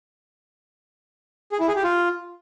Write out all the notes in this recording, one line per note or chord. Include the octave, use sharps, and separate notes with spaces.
G#4
E4
G#4
G4
F4